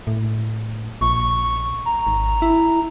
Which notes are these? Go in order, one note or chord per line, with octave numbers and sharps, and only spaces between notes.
A2
A#1 C#6
A#5
G#1
E4